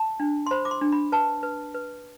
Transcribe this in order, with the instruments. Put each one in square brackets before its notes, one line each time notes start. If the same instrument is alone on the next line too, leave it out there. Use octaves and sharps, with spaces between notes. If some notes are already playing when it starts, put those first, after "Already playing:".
Already playing: [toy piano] A5
D4
C6
C5 B5
D6
C6
D4
B5
B4 A5
B4
B4